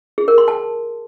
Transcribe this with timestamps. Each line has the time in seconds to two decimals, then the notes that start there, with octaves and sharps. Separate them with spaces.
0.18 G#4
0.28 A#4
0.38 C6
0.48 A5